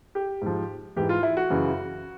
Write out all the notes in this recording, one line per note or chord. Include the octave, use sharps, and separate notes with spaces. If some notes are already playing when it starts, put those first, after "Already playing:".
G4
G#2 F3
G#2 E3 G4
F4
E4
F#4
F#2 C#3 E3